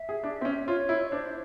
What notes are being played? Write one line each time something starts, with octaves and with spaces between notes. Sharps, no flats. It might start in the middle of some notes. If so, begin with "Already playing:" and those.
Already playing: E5
G#4
D4
C4
C#4
F4 C#5
E4
D4 C5